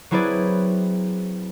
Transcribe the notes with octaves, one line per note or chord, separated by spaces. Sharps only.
F#3 C4 E4 G#4 B4 D5